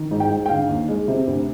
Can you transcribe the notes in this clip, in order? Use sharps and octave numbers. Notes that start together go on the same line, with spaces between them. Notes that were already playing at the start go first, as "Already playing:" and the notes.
Already playing: D#3
G#2
G5
G#2
G5
D3 F5
D#2
G#3
C3
D2